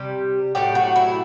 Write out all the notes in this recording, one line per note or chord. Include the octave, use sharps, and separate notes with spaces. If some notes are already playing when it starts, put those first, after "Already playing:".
Already playing: C3 G3 G4
A2 F#3 A3 G4
F#4
E4